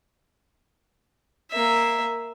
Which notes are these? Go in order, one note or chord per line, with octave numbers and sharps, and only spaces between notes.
A#3 E5